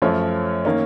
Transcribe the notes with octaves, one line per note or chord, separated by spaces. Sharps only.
F#2 F3 A3 C#4 C#5
D#3 A#3 C#4